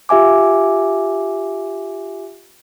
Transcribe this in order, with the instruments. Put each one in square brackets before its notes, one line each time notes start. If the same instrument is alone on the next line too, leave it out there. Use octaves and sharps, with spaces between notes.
[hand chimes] F4 G4 E5 G#5 D6